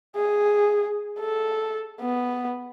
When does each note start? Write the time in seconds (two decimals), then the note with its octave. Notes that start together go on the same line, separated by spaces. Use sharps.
0.16 G#4
1.19 A4
2.00 B3